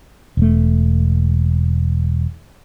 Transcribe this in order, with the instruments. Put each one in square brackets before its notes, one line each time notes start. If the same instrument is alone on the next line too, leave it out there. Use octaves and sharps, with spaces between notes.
[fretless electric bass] E1 A3